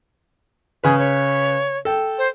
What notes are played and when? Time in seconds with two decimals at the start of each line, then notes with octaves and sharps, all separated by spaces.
0.84 C#3 G#4 B4
0.99 C#5
1.85 A4 G5
2.18 C5